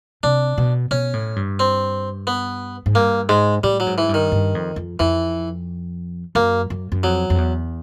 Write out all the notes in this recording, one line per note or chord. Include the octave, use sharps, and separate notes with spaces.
C3 D4
B2
B2 C#4
A2
G2
C4
B3
G#2
G2 A#3
G#2 G#3
A2 G3
F#3
G#2
E3
G2
D#3
G2
F2
F2
F2 E3
F#2 A#3
F#2
F#2
F2 F#3
F2
E2